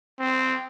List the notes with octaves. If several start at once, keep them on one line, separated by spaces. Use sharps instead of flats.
C4